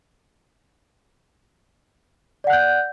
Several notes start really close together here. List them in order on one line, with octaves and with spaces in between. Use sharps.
D5 F#5 F#6 G6